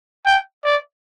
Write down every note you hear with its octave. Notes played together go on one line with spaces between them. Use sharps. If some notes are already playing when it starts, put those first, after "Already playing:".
G5
D5